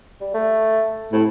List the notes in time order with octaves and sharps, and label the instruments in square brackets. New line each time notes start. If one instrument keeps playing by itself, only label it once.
[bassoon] G3
A3
[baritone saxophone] A2 [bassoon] C3